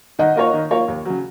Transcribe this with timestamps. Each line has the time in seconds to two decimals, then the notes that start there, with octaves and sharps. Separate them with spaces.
0.19 D#3 D#5 F#5
0.36 A#3 F4 A#4 C#5
0.54 D#3
0.71 A#3 F4 A#4 C#5
0.88 D#2
1.05 C#3 F#3